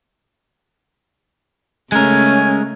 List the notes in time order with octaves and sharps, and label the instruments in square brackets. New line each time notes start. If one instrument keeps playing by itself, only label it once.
[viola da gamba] C#3 A3 [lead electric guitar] G#3 A#4 [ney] C#4 [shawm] G#5